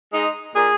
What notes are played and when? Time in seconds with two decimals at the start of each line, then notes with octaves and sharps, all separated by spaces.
0.13 G#3 D#4
0.55 A#2 G#4